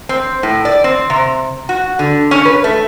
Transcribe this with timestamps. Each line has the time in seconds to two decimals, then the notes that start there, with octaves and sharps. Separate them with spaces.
0.09 C4
0.43 A2
0.65 D5
0.84 C4
1.10 C3
1.69 F#4
1.99 D3
2.31 C#4
2.45 B4
2.64 A3